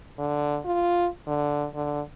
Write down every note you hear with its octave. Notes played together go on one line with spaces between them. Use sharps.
D3
F4
D3
D3